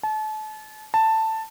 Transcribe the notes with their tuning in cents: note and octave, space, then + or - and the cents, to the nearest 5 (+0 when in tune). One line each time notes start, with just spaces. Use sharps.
A5 -35
A5 +10